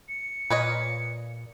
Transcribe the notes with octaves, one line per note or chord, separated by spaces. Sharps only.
C#7
A#2 B4 C#5 D#5